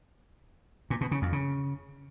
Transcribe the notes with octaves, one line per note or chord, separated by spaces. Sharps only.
A#2
B2
C#3
F2
C#3